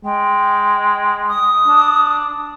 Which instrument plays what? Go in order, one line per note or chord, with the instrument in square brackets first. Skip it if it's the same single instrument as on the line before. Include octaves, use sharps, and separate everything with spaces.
[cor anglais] G#3 [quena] G5
[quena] D#6
[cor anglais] D4